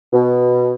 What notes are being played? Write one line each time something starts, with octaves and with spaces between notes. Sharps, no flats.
B2